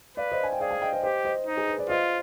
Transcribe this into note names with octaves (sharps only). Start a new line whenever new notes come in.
B4 D5 F5
C5 D#5
G#5
G5
G#4 D5 F5
F5 G#5
D#5 G5
C5 D#5
G4 C5 D#5
C5 D#5
D#4
G#4 C5
B4
B4 D5
F4 C5 D#5